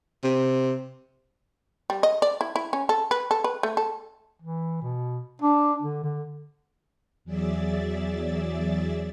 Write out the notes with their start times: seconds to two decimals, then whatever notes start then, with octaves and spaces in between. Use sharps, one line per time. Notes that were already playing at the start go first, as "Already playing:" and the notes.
0.24 C3
1.90 G3
2.03 D#5
2.22 D5
2.41 E4
2.56 E4
2.73 C#4
2.89 A4
3.11 B4
3.31 A4
3.44 B4
3.63 A3
3.77 A4
4.42 E3
4.82 B2
5.42 D4
5.82 D3
6.04 D3
7.25 E2 F#3 G#4 D5 E5 A6